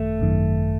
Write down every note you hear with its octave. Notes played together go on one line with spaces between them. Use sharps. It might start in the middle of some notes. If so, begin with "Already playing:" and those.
Already playing: G#1 F#2 D#3 A3
G#1 F#2 D#3